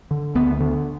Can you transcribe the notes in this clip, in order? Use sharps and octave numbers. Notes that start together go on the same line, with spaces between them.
D3
D2 B3
D3